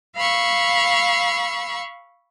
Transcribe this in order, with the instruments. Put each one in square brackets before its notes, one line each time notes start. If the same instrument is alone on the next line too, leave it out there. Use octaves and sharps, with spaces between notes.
[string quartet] F5 B5 C#6 E6